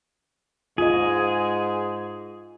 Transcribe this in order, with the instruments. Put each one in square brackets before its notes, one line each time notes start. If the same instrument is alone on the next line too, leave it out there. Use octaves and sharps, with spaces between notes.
[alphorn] G#2 [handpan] F4 D#5 [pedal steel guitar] G#4